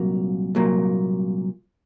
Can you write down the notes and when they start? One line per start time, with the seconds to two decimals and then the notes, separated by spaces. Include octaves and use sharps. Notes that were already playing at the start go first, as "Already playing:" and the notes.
Already playing: C2 A#2 F#3 A#3
0.55 C2 A#2 F#3 A#3